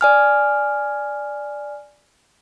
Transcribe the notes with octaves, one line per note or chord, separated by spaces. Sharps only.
D5 G#5 F6